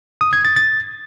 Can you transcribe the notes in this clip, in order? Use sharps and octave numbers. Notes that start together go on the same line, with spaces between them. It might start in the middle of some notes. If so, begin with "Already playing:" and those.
D#6
G#6
A6
A6